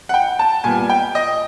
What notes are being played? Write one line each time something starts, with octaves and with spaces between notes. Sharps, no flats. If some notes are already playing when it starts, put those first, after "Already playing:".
F#5
G5
A5
A#2 G3 B3 G#5
G5
D#5